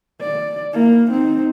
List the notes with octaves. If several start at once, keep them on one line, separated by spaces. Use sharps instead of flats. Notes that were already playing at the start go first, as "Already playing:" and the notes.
D5
A#3 E4
C4 D#4